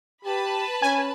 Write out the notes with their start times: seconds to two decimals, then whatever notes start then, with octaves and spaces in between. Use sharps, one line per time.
0.25 G4 B4 A5 B5
0.82 C#4 G#5